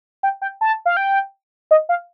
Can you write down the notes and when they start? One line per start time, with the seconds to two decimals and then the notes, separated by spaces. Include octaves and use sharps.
0.23 G5
0.42 G5
0.61 A5
0.86 F5
0.97 G5
1.71 D#5
1.89 F5